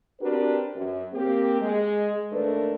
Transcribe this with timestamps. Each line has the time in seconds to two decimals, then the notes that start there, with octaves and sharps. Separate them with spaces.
0.21 C4 D4 F#4 G4 A#4 B4
0.76 F#2
1.13 A#3 C4 G4
1.61 G#3
2.33 D#2 A3 D4 A#4 B4